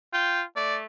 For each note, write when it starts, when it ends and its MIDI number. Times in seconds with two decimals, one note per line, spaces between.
0.13 0.44 65
0.13 0.41 79
0.56 0.86 57
0.56 0.76 74